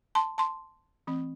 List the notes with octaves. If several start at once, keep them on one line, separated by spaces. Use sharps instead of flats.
A5 C6
A5 C6
E3 A3 C4